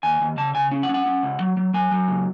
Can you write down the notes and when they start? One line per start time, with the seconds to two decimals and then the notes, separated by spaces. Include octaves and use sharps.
0.03 D#2 G#5
0.21 D#2
0.37 C#3 A5
0.55 C#3 G#5
0.71 C#4
0.83 F#5
0.89 C#4
0.94 F#5
1.06 C#4
1.23 C#2
1.40 F#3
1.57 F#3
1.74 F#3 G#5
1.91 F#3
2.08 C#2